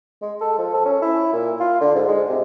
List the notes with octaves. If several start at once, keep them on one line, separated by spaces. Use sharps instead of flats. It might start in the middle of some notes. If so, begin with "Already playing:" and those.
G#3
A4
F3
A4
C#4
E4
A#2
F4
D3
G#2
G#3
C3